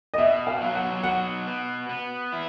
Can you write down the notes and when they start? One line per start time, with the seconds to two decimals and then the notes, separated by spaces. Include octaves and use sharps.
0.14 D#5
0.18 B2 E5
0.47 F5
0.61 F#3
0.75 F#5
1.04 B2 F#5
1.47 B3
1.89 B3
2.32 E4